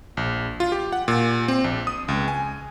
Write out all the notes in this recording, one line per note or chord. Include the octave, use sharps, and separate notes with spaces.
A#1
F4
G4
F#5
A#2
C4
A#1
D#6
C#2
G#5